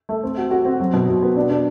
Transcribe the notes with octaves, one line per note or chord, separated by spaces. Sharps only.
A3
C4
F#4
F#4
C4
F#3
B2
B2
B3
D4
D4